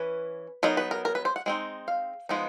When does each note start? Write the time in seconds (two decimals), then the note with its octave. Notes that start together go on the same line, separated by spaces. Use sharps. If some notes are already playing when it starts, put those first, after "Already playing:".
Already playing: E3 C#4 B4
0.63 F#3 B3 D#4 A#4
0.77 B4
0.91 A#4
1.05 A#4
1.15 B4
1.25 C5
1.36 F#5
1.46 G#3 C4 D#4
1.88 F5
2.29 F3 G#3 B3 D#4